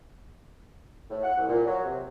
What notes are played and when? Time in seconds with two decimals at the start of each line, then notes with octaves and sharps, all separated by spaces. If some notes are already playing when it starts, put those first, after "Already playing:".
1.10 A2
1.23 F#5
1.37 C2
1.49 A#2
1.66 F#3
1.84 C3